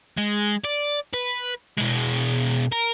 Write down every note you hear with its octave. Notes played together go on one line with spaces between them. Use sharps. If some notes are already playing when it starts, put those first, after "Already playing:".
G#3
D5
B4
B2 G#3
A#4